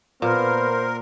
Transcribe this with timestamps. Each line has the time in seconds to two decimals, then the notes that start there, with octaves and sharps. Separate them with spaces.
0.22 A#2 B3 A#4 C5